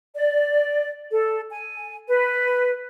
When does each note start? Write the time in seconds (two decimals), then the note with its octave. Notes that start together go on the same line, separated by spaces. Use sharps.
0.14 D5
1.11 A4
1.51 G#5
2.08 B4